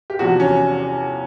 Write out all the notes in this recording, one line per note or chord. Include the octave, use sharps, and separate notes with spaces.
G4
E2 C3 F3 F#4
C#4